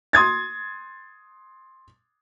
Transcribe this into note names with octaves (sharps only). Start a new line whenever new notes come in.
C6 D#6 G#6 A6